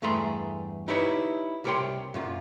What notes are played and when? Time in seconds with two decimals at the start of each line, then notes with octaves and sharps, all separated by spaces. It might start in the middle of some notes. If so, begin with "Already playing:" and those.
0.02 E2 G2 A3 G#4 A#5 C6
0.88 D#4 E4 G4 B4 C#5 E5
1.64 C2 G4 A#4 C#5 G5 C6
2.14 F#2 A#2 F4